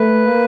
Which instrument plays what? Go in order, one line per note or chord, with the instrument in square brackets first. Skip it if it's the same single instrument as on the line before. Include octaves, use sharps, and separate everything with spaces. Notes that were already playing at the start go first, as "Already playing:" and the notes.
Already playing: [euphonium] A3 [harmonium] B4
[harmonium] A#3